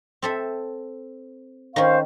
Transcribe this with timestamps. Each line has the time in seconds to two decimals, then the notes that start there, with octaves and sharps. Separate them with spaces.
0.22 C4 A4 E5
1.76 D#3 C#4 C5 F5 C#6